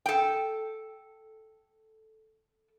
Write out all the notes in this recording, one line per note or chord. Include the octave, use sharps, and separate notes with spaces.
A4 G5